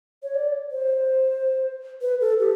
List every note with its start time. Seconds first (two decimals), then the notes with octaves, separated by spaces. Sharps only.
0.23 C#5
0.35 D5
0.72 C5
2.02 B4
2.21 A4
2.40 G4